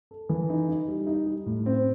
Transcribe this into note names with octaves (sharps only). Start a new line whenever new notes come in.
A4
E3
D#4
D#4
G3
D#4
G3
A2
C4